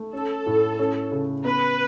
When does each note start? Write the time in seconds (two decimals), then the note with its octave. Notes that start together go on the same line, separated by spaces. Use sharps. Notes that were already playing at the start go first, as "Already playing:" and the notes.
Already playing: A3
0.13 C#4 A4
0.46 A2
0.79 C#4
1.12 C#3
1.45 B3 B4